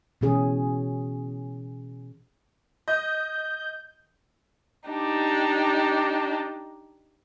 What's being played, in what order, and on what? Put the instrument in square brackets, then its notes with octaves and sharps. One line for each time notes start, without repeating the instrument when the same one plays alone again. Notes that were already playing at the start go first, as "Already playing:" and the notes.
[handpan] B2 E3 C#4 G#4
[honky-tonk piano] D#5 [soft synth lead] G6
[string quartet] D4 D#4 G4